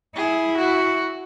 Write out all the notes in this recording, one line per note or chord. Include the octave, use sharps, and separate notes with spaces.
E4 G#4
F#4